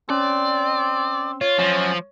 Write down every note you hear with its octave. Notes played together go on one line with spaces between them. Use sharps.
C4 C#4 D5
F4 C#5
F#2 F3